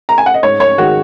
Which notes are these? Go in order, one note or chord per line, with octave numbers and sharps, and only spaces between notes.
A#5
G#5
F#5
D#5
G#2 C#5
C#5
D#3 G#3 F#4